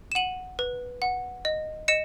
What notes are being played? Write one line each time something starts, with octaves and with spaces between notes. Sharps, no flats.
E7
F#5 D#7 F#7
B4
F#5
D#5
D#5 C#7 E7